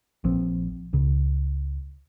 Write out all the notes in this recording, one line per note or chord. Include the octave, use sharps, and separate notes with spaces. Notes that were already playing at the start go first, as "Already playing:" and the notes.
A#1 F3 C4
C#2 C#3